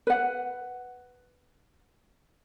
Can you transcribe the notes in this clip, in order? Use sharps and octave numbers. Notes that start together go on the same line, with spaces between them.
B4 F#5